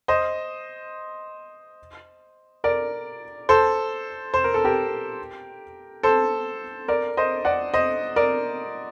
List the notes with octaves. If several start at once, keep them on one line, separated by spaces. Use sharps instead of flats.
C5 D#5
A#4 D5
A4 C5
C5
A#4
A4
G4 A#4
A4 C5
A#4 D5
C5 D#5
D5 F#5
C5 D#5
A#4 D5